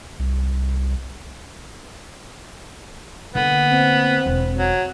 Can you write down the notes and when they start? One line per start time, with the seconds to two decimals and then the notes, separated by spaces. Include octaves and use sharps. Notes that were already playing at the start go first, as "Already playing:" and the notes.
0.19 C2
3.35 D3 A#3 B3
3.72 C4
4.26 E1
4.57 F#3